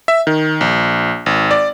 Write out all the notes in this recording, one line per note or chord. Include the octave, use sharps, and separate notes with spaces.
E5
D#3
A#1
G#1
D5